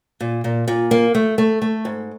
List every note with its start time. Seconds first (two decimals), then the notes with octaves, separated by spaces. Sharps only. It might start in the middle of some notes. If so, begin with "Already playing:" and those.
0.20 A#2
0.44 A#2
0.68 A#2
0.91 A#3
1.15 A3
1.38 A3
1.62 A3
1.85 G#2